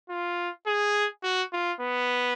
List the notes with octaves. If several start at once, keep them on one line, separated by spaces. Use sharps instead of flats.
F4
G#4
F#4
F4
B3